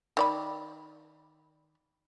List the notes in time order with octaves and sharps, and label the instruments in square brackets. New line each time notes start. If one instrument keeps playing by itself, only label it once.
[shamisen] D#3 D5 B5